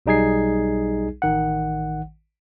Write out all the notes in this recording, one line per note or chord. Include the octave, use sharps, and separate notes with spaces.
B1 G3 D#4 G#4 G#6 C7
A1 D#3 F#5